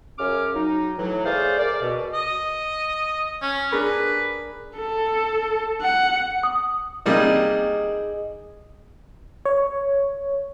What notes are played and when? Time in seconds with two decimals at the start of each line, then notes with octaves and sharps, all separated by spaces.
0.18 F#2 C#3 C#4 D6 F6
0.54 F#3 D#4
0.97 A2 E3 F#3
1.25 A3 G#4 C5 D5 F5
1.59 G#4 A#4 D5
1.81 B2
2.13 D#5
3.42 C#4
3.72 D4 G#4 A#4 B4
4.77 A4
5.81 F#5
6.43 D#6
7.06 C3 G3 A#3 D#4 G#4 D#5
9.45 C#5